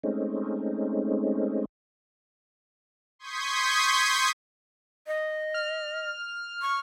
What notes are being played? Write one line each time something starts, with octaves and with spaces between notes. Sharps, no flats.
G#3 A3 C4 C#4 D#4
C6 C#6 D#6 G6 G#6 B6
D#5
F6
C#6